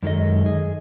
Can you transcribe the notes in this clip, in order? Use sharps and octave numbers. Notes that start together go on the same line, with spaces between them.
F#2 D#3 G#3 A4 D#5
G#4